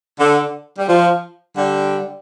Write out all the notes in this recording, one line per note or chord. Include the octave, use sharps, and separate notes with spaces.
D3
G3
F3
D3 G3